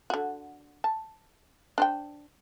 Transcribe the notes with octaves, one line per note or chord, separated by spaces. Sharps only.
D3 F#4
A5
D4 C5 G5